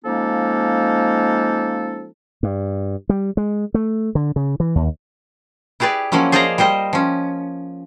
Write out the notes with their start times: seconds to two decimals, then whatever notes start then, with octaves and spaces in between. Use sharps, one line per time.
0.04 F3 G#3 A#3 C#4 D#4 A4
2.43 G2
3.09 G3
3.37 G#3
3.74 A3
4.15 D3
4.36 C#3
4.60 E3
4.75 D#2
5.80 E4 G4 G#4 B4 D5
6.12 F3 F#3 A#3 C#4 E4
6.32 G#4 C5 D5 D#5 F5 A#5
6.58 G3 A#4 C5 D#5
6.93 F3 C#4